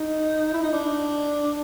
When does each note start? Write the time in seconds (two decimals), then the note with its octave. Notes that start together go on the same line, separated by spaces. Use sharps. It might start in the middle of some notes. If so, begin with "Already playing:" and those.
Already playing: D#4
0.53 E4
0.63 D#4
0.73 D4